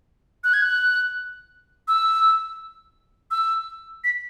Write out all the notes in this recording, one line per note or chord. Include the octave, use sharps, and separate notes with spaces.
F#6
G#6
F#6
E6
E6
B6